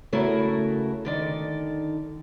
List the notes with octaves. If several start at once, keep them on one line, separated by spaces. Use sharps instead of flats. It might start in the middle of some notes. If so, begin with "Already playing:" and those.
C#3 A3 E4 F#4 A#4
D3 D#3 D5